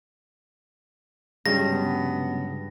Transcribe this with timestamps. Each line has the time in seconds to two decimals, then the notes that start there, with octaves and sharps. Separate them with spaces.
1.46 G2 C#3 F#3 G#3 A#6
1.69 B3